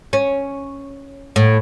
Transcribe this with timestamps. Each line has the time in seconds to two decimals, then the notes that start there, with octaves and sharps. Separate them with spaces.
0.13 C#4
1.36 A2